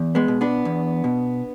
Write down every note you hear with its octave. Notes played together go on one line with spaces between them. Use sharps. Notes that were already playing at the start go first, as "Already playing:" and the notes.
Already playing: E2
G#3 B3
B2
B3 D4
E2
B2